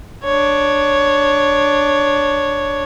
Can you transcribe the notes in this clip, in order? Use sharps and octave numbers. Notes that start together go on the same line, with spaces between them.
D4 C#5